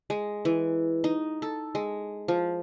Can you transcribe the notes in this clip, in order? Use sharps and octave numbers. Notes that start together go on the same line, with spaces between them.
G#3
E3
D#4
A4
G#3
F3